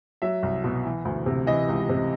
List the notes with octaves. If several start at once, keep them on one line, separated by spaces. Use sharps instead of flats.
F#3 E5
C2
B2
E3
D2
C3
E3 D#5
C#2
C3